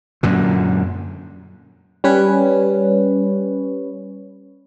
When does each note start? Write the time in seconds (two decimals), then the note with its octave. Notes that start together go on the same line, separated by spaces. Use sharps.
0.23 F#2 A#2 D3
2.04 G3 C#4 B4 C#5